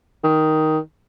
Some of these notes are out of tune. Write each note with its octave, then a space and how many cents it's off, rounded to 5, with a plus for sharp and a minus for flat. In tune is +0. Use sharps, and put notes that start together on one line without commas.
D#3 +5